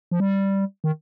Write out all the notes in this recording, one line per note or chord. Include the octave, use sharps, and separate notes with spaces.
F3
G3
D#3